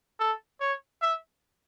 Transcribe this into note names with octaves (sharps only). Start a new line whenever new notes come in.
A4
C#5
E5